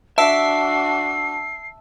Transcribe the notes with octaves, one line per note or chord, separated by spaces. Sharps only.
D4 F#4 E5 A5 E6 C7